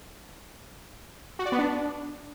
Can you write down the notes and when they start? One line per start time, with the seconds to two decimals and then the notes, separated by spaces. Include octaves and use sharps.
1.39 F#4
1.46 D5
1.52 B3
1.59 D4